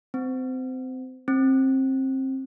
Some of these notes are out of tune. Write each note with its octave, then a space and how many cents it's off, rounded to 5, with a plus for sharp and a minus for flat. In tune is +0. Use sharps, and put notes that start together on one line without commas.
C4 -25
C4 +25